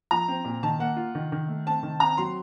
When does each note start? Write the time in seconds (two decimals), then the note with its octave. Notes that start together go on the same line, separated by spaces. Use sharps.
0.11 F3 A#5
0.28 C4
0.45 A#2
0.63 D#3 A5
0.79 A#3 F#5
0.96 F4
1.15 D#3
1.32 D#3
1.48 A3
1.66 C4 A5
1.83 D#3
2.00 C4 A#5
2.17 F#3 C6